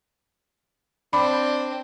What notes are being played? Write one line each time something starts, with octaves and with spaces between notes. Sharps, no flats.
C4 D4 B5